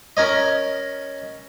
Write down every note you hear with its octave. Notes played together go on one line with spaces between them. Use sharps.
C#4 A#4 C#5 D#5